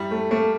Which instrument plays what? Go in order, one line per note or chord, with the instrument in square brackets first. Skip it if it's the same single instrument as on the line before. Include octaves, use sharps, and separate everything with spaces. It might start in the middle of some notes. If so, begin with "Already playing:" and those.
Already playing: [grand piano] F#2 G3 E4
[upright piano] A3
[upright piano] A3 [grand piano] A#3